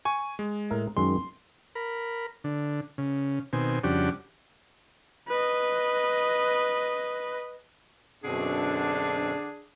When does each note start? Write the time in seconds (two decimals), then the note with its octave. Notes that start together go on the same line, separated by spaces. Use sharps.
0.05 G#5 C#6
0.39 G#3
0.70 A2 A#4 E5
0.97 F#2 D#3 G#3 C6
1.75 A#4 B5
2.44 D3
2.98 C#3
3.53 B2 D#3 C4 G#5
3.84 F2 C#3 G3 D4 F#4 G4
5.28 B4 D#5
8.24 F#2 B2 D3 C4 D4 G#4